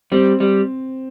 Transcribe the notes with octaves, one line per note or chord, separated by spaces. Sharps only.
G3 C4
G3